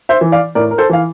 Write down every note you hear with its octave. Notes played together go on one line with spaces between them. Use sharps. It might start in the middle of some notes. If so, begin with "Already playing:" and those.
C5 E5
E3
D5 F5
A2 A#4 D5
A#4
A4 C5
E3 F5